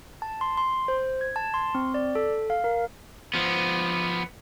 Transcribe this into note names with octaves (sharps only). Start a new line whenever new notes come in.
A5
C6
C6
C5
G#6
A5
C6
C4
D5
A4
F5
A#4
F3 B3